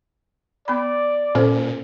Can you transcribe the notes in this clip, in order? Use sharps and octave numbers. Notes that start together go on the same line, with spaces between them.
B3 D5 B5
A#2 C#4 A4 C5